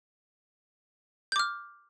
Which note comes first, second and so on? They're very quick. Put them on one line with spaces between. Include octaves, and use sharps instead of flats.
G6 D6 F6